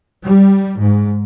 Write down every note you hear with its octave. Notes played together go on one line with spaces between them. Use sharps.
G3
G#2